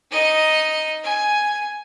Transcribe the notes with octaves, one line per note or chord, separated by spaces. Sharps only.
D#4 D#5
G#5